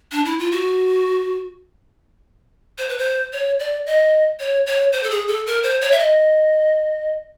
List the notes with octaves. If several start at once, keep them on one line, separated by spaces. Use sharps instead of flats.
D4
E4
F4
F#4
C5
B4
C5
C#5
D5
D#5
C#5
C#5
C5
A4
G#4
A4
A#4
C5
C#5
E5
D#5